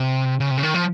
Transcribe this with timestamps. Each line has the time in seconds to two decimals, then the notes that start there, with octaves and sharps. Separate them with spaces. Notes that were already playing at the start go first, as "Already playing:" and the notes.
Already playing: C3
0.40 C#3
0.51 C3
0.58 C#3
0.63 D#3
0.74 F3